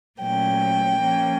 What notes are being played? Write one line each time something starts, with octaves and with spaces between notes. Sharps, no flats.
A#2 F#3 A3 C#4 G5
F3 A#3 C#4